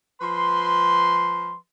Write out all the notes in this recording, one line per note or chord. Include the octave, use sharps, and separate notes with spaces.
F3 B4 C6